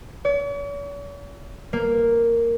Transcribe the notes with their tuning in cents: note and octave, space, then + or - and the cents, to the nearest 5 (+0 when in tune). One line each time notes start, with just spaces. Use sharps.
C#5 +45
A#3 -5